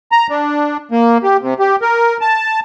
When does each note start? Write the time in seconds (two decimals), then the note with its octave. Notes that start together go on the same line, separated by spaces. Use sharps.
0.12 A#5
0.30 D4
0.91 A#3
1.23 G4
1.42 C3
1.59 G4
1.82 A#4
2.21 A5